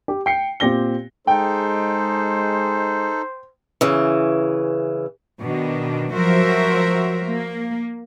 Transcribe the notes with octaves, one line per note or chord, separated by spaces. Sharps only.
G4
G5 C7 C#7
A#2 C4 G4 A#6 G7
G#3 D#4 A4 C5 G5
C#3 E3
B2 D#3 D4
F3 F#3 F#4 A#4 C5 E5
A#3